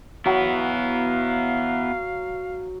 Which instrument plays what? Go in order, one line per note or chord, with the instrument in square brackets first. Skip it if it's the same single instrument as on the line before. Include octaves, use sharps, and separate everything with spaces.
[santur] F#3 [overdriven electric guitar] B3 E4 [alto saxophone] F5